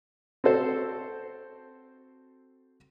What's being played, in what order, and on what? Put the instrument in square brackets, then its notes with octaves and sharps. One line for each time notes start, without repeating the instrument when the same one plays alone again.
[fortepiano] C4 F#4 A4 C5